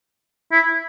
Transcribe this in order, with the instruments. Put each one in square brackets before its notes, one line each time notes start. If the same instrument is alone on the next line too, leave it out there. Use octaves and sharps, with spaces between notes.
[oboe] E4